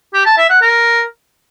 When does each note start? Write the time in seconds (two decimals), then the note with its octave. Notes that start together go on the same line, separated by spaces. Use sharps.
0.14 G4
0.26 A5
0.37 E5
0.49 F#5
0.61 A#4